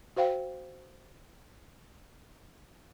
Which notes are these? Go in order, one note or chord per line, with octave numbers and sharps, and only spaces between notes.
F#4 C5 F5 G5